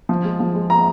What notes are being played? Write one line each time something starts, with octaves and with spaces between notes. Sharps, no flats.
F3
G#3
F3
G#3
A#5